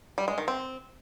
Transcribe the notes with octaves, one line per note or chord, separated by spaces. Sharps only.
G3
G#3
D#3
C4